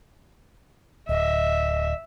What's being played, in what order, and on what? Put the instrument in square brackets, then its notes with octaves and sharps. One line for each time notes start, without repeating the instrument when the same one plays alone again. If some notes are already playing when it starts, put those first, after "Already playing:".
[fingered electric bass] D1 [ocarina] D#5 [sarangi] E5